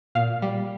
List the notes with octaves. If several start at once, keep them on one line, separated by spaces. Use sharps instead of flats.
A#2 F5
G3